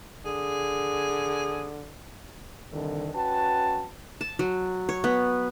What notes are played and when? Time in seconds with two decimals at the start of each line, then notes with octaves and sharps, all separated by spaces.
0.25 D3 G#4
2.72 C2 D3 D#3
3.15 C#4 F#4 B4 G5 A5
4.21 A5
4.39 F#3
4.89 C#5
5.04 B3